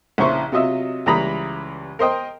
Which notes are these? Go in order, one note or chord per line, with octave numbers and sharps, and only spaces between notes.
A#1 C#3 E4 C5 C#6
C3 F#3 F4 D#5 E5
C#2 E3 G3 A#5 B5 D#6
A#4 C5 D#5 G5